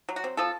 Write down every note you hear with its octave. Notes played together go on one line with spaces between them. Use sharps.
F#3
F#4
C4
F3 A4